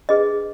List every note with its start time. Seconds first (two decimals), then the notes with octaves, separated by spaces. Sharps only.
0.09 D4 G#4 B4 D#5